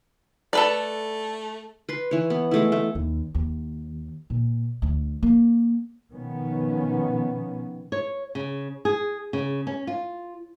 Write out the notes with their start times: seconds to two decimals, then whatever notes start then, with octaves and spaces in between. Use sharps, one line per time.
0.53 A3 A4 B4 D5
1.89 B4 C6
2.11 E3 C#5
2.30 B3
2.51 G#3 A3 E4
2.72 A3
2.95 D#2
3.35 D#2
4.30 A#2
4.82 D2
5.23 A#3
6.12 B2 D#3 F3 B3 C#4
7.92 C#5
8.35 C#3
8.85 G#4
9.33 C#3
9.67 C#4
9.87 F4